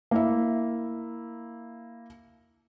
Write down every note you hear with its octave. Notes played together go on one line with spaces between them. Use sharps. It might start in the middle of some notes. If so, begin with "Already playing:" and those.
A#3 E4 E5